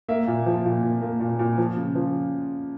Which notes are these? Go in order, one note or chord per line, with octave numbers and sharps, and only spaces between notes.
A#3 E5
A#2
F3
A#2
A#2
A#3
A#2
A#2
F3
C#3
F3